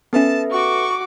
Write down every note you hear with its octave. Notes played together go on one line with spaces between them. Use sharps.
B3 C#4 A4 B4 E5 A5
F#4 C#6 D6